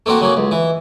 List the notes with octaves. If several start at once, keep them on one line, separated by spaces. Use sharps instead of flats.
A3 A#3 C4 F#4
C#3 F#3 A#3
C#2
E3